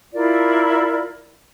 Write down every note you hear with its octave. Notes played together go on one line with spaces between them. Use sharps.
E4 F4 A#4 D5